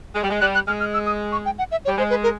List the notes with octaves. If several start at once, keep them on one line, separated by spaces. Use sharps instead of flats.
G#3
G3
G#3
G3 F#6
F#6
G#3 F6
F6
E6
D#6
C#6
G5
F#5
E5
C#5
G3
G#3 C5
B4
A#4